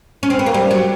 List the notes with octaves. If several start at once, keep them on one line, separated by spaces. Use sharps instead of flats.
C#4
C4
B3
A#3
G3
F#3